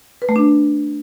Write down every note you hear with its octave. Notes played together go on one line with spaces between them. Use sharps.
B4
A3
D4